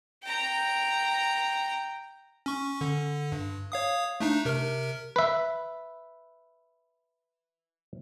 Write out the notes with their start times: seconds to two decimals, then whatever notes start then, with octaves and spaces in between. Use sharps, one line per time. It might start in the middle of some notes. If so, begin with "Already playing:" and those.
0.23 G5 A#5
2.46 C#4 C#6
2.81 D3
3.32 G2
3.72 C#5 F5 D#6
4.20 A3 D4 D#4
4.45 C3 A#4
5.16 B4 E5